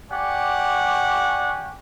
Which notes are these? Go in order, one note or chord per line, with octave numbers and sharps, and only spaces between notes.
G4 D5 F#5 G#5 C#6